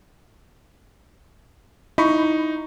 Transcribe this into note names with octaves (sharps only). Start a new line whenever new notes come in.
D#4 E4 B5 C#6